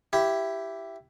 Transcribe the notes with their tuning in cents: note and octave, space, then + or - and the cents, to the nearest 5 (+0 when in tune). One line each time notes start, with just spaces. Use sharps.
E4 +10 G4 -5